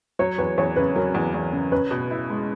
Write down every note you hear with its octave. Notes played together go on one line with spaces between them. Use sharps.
F#3 C#5
E2 B4
E2 C#5
C#3 B4
F#3 A#4
E2
E2
C#3
C#4 B4
B2
E4
G#3